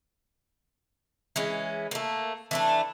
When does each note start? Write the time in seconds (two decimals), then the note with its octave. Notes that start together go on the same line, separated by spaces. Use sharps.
1.36 E3 G#3 C#4
1.91 A3 A#3
2.51 E3 A3 D4